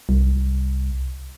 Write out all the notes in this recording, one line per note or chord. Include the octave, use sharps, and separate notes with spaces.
C2